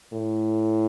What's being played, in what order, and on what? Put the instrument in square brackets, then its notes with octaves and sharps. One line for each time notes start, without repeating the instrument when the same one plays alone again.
[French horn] A2